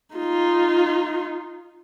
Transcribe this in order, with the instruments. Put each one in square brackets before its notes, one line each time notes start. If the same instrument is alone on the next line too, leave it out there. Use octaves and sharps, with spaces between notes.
[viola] D#4 F4